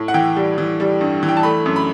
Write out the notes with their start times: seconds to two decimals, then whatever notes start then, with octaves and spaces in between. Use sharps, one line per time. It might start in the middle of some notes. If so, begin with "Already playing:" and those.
Already playing: A2
0.08 F#5
0.14 E3 G5
0.36 G3
0.58 E3
0.80 G3
1.01 G2
1.23 E3
1.29 G5
1.37 A5
1.43 A3 B5
1.66 F#2
1.76 B5